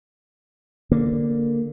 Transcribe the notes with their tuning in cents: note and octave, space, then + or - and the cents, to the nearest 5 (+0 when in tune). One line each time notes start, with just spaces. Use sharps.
D3 +0 A#3 +0